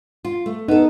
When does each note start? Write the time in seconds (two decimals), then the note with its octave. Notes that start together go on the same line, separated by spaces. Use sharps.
0.25 F4
0.46 A3
0.68 B3 D#4 A4